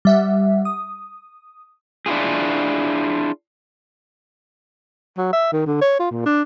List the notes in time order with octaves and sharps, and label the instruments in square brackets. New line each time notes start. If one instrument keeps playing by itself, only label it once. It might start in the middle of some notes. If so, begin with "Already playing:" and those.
[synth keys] G3 E5 F#5
D#6
[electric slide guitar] D4 E4 F4 G#4
[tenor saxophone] F#3
E5
D#3
D3
C#5
F4
A#2
D4